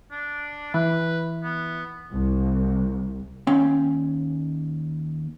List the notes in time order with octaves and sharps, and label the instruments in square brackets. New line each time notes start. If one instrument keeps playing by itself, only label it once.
[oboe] D4
[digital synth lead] E3 [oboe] B4
[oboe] B3
[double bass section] C2
[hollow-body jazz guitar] D#2 C#4 G5